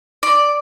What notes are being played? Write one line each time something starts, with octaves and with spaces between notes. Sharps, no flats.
D5